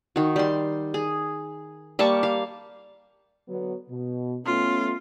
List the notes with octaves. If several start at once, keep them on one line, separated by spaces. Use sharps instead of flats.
D#3 F#4
G3 C6
G#4
G3 A#3 A5 C#6
F5
D3 F#3 B3
B2
A3 B3 C#4 F4